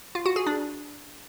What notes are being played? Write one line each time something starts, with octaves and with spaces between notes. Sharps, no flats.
F4
F#4
G#4
D4